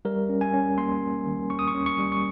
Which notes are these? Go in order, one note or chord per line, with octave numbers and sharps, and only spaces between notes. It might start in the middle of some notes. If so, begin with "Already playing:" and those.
G3 A#4
C#4
G#5
C#4
A#3 C6
G3
D#3
C#4 C#6
D#6
C#6
C#4
C#6
G3
C#6